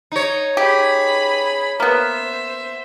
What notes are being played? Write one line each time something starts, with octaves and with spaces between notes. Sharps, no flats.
D#4 C#5
G4 G#4 B5
A#3 B3 C5 E5